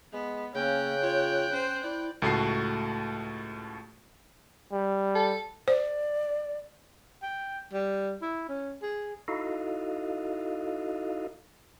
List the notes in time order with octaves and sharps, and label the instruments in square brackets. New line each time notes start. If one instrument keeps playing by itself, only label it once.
[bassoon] G#3 [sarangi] B3
[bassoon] C#3 [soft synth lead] A#3 [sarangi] C#4 [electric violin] G5 F#6
[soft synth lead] F4 [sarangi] C#5
[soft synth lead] C#4 [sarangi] C5
[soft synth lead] E4 [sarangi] D5
[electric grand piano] C#2 A2 A3 F#4 A5 C7
[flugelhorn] G3
[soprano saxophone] A4
[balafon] C5 [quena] D5
[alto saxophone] G5
G3
E4
C#4
G#4
[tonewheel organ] D#4 E4 F#4 A4 D#5 F5